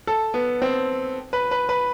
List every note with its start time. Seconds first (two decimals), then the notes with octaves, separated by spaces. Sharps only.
0.07 A4
0.34 B3
0.62 C4
1.33 B4
1.51 B4
1.69 B4